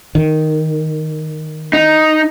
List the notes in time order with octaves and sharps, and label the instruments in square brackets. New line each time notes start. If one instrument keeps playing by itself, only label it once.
[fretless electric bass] D#3
[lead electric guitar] D#4